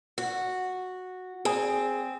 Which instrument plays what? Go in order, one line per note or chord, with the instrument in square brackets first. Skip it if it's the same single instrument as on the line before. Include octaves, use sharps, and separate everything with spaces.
[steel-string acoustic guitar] F#4
[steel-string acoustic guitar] C4 [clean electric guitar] G#4